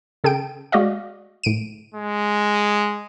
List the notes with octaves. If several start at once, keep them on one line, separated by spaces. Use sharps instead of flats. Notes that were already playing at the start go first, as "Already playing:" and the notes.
C#3 G#4 A4 G5 D7
G#3 F#4 D5 D#5 F5
A2 D7 D#7
G#3